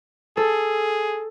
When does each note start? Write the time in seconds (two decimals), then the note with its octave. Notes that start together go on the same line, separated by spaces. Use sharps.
0.37 G#4 A4